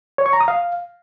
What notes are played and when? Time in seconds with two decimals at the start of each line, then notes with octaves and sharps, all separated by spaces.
0.18 C#5
0.26 C#6
0.33 A#5
0.41 D#6
0.48 F5